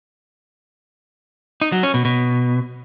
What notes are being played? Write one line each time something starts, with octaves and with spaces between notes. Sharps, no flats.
D#4
F#3
C#4
B2
B2